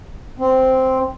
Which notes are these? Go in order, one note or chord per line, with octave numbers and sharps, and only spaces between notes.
C4